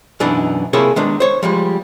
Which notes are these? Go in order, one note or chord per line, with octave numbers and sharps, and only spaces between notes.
F#2 B2 E3 B3 D4 D#4
C3 A#3 E4 G#4 A4 C#5
D#3 G#3 B3 D4
C5 C#5
F3 G3 G#3